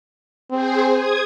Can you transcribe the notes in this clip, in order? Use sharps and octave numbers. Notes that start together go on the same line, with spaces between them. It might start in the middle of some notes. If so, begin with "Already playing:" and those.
C4 G#4 C5
D#6 G#6